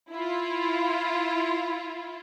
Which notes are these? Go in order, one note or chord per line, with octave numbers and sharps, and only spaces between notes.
E4 F4